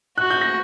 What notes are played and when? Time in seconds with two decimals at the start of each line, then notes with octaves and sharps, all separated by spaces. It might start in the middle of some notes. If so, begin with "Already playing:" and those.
0.18 F#4 F#6
0.30 G6
0.41 A#6